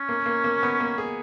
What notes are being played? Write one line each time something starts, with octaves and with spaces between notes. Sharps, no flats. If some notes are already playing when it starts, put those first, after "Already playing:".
Already playing: C#4
A#3
A#3
A#3
B3
A#3
G#4